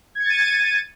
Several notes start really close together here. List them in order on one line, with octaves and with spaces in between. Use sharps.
G#6 C#7 A6 D#7